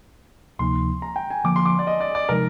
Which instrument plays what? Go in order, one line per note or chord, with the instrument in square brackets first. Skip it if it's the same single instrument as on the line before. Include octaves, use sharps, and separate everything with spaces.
[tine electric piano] D2 C3 F3 A#3 D#4 [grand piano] C6
[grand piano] A#5
G5
G#5
[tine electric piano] D3 F3 A#3 [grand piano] D6
[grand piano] C6
D6
D5
D#5
D5
D5
[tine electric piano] C3 F3 G#3 D#4 [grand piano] A#4